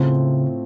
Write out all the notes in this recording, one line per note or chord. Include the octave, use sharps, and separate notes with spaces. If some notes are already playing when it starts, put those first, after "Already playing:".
Already playing: A2 C#3 A3 C4 F4